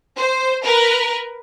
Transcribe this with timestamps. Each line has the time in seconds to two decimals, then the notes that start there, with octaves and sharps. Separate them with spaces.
0.17 C5
0.63 A#4 B4